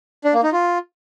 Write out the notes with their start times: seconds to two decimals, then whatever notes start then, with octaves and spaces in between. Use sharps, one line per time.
0.24 D4
0.34 A#3
0.43 D#4
0.53 F4